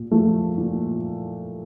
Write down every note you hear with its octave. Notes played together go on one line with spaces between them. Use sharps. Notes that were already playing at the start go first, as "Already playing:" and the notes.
Already playing: A#2
F3 A3
A#2